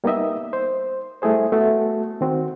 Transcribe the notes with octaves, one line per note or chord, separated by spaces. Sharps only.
G3 A#3 B3 D#4 D#5 E5
C5
G3 A3 E4 G#4 C5
A3 B3 F#4
D#3 C4 F#4